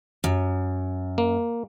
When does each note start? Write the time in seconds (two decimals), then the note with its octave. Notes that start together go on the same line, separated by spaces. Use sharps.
0.24 F#2
1.18 A#3